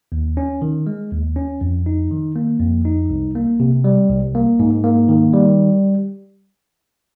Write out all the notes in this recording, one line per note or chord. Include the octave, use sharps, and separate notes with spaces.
D#2
C#4
D#3
G#3
D#2
C#4
F2
D#4
D#3
A#3
F2
D#4
C2
A#3
C3
G3
C2
A#3
G#2
A#3
D#3
G3